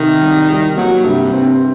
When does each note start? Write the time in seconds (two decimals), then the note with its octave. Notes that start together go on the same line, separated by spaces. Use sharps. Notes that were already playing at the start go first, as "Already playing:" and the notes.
Already playing: C3 D#3
0.22 C2
0.50 G3
0.77 F#3 A#3
1.05 G2 C3
1.33 G2 C4